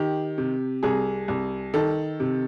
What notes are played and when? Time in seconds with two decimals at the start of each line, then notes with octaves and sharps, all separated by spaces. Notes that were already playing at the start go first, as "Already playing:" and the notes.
Already playing: D#3 G4
0.38 C3
0.83 C2 G#4
1.28 C2
1.74 D#3 A4
2.20 C3